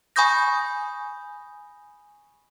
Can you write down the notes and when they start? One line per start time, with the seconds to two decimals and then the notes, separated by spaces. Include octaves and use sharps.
0.16 G#5 B5 C#6 D#6 G6 A#6